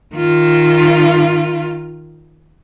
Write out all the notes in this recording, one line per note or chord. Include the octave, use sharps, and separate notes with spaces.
D#3 F4